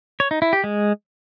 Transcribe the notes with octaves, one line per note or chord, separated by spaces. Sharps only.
C#5
D#4
E4
G4
G#3